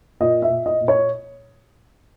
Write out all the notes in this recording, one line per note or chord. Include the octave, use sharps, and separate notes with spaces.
A#2 D#5
E5
A#2
D#5
A#2
C#5